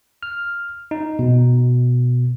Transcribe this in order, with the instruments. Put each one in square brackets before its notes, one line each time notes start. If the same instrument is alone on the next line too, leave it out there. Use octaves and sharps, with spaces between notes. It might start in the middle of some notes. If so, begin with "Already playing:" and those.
[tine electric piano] F6
D#4
B2